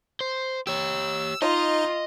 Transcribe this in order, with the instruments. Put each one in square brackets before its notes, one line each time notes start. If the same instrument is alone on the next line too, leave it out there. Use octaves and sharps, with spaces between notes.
[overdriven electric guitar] C5
[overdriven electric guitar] G4 C#5 [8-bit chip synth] E6
[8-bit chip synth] D#4 [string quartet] F4 [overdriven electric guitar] D#5